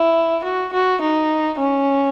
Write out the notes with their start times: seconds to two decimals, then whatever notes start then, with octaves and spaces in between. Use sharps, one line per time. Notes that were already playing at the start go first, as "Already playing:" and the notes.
Already playing: E4
0.44 F#4
0.73 F#4
1.01 D#4
1.59 C#4